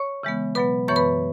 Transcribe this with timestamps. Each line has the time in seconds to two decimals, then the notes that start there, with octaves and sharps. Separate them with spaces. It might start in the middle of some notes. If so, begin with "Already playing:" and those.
Already playing: C#5 C#6
0.23 C#3 E3 G#3 B3
0.55 B2 F#3 B3 B4 B5
0.88 F#2 E3 B3 C#5 C#6
0.96 B4 B5